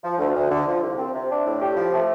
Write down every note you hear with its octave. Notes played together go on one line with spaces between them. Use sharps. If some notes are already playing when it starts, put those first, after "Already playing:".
F3
D2
D2
D3
F3
C2
C4
C3
D4
A2
G4
F3
A3